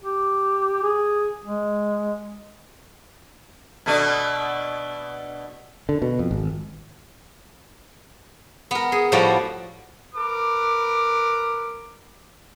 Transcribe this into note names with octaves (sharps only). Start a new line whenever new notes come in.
G4
G#4
G#3
B2 A3 D4
D3
B2
F2
G#1
B3 A#4
G#4
A2 F3 G3 F#4 D5
A#4 B4 D6